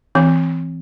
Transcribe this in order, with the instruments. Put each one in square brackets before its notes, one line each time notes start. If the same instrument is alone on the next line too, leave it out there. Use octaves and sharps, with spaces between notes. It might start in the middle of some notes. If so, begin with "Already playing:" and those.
[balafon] E3 C4